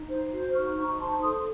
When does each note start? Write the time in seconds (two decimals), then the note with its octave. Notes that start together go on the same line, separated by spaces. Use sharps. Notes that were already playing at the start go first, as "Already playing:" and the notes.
Already playing: D#4
0.09 C5
0.32 F#4
0.54 D#4 C#6 F6
0.77 D#4 A#5 C#6
1.00 C5 A5 C6
1.22 A4 C6 D#6